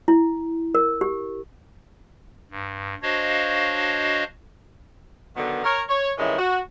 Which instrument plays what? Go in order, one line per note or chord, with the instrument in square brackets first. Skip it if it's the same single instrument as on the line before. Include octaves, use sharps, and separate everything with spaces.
[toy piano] E4
A#4
G4
[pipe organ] G2
D4 F#4 C5 C#5 D#5 F5
[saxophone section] B2 D3 D#3 F#3 B3
A#4 C#5
C#5
G2 D#3 E3 G#3 C#4 E4
F#4